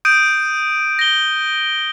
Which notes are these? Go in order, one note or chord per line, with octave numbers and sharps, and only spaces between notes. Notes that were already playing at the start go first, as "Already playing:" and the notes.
D#6 G6 D7 D#7
A#6 G7